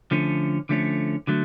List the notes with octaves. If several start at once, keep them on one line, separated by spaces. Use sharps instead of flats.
D3 F3 A3 C#4
D3 F3 A3 C#4
D3 F#3 A3